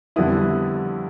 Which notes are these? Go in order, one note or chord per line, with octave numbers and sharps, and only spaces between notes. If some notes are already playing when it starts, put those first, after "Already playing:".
F2 D3 G3 B3 E4 D#6